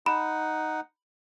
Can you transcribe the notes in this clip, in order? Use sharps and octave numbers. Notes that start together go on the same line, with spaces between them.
D#4 F#5 B5